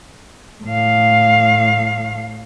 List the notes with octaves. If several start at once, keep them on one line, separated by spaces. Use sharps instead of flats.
A2 F5